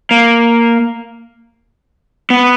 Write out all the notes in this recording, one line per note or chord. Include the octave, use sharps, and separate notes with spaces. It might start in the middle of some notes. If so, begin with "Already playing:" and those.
A#3
B3